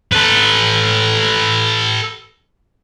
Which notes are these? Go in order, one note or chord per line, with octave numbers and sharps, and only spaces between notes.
A4 B4